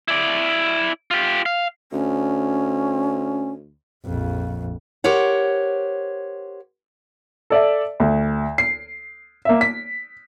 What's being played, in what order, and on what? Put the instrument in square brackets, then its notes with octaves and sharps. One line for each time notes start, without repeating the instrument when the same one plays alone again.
[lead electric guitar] E4 D5
F4 G4
F5
[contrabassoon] D2 [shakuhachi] C#4
[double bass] A#1 F2
[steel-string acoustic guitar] G4 A#4 C5 C#5 F#5
[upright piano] A4 D5 E5
D2
C7
A#3 E5
B6